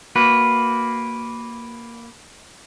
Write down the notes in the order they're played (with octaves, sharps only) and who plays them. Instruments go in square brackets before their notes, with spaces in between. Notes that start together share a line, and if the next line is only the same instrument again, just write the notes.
[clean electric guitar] A#3 F#4 B4